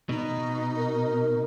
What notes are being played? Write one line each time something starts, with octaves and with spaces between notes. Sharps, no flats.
B2 D#4
A#4